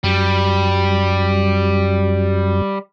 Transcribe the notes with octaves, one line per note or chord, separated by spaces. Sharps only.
F#2 G3